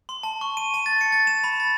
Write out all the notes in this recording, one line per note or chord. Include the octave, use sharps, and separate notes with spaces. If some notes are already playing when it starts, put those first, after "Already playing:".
C6
A5
C#6
D#7
A5
A6
C#7
A6
E7
B5
A6